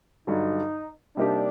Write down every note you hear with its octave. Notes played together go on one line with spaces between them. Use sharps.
G2 D3 F#3 D#4
C3 G3 A#3 D4 D#4 G4